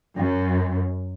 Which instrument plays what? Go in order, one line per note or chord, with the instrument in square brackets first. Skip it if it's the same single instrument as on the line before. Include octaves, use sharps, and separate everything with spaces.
[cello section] F#2